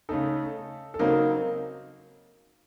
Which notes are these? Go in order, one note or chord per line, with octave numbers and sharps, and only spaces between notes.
C#3 A3 D#4 A4
A4
C#3 F#3 A#3 C4 D#4 A#4